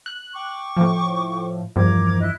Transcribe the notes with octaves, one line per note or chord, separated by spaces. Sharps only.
F#6
G5 C#6 D6
A2 F3
E2 G2 F3 A#4 D6 G#6
E4 D#5 F#6